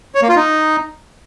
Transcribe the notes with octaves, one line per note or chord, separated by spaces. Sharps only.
C#5
A#3
F4
D#4